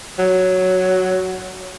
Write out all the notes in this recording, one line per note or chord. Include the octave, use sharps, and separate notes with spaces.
F#3